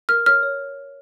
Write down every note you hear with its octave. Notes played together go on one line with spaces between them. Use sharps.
A#4 F6
C#5 F6
C#5